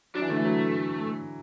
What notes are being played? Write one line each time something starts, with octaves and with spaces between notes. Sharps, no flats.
F#3 D4
E3
D3 A3
E3
F#3